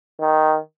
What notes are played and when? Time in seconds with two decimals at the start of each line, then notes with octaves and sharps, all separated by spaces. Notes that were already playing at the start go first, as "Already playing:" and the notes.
0.20 D#3